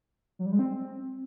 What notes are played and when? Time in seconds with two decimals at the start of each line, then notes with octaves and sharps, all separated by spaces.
0.39 F#3
0.46 G3
0.52 G#3
0.59 C4